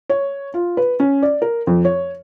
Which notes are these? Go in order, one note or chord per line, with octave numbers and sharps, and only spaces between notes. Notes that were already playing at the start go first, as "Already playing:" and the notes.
C#5
F4
B4
C#4
D5
A#4
F2
C#5